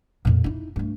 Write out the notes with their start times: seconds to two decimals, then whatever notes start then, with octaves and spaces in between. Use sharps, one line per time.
0.25 F2 A#2
0.44 D#4 E4
0.76 G2 A3